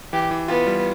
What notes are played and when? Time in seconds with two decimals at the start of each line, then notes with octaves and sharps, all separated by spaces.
0.13 E3 G4
0.31 E3
0.48 B3 F4
0.67 G3